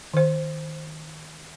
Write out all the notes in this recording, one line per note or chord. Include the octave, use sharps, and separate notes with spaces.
D#3 C5